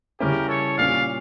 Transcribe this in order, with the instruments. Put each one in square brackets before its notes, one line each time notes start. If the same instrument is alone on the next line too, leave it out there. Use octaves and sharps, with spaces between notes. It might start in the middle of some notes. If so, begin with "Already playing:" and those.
[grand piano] C#3 G3 C#4 E4 [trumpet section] G4 A#4
[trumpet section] A4 C#5
[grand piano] A#2 G3 C#4 [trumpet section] D5 F5